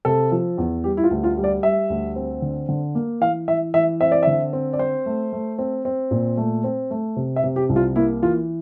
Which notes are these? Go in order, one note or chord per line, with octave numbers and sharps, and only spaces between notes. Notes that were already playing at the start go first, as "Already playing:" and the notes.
C3 A4
F3
E2
G3 G4
E4
F4
D2
F4
G3
D5
G3 E5
D2
C4
D3
D3
A#3
E3 F5
E3 E5
E3 E5
C4 E5
D5
D3 E5
C4
D5
C4 C5
A3
A3
C4
C4
A#2
A3
C4
A3
C3
E5
C3
G4
C2
F4
A#3 E4
E3 F4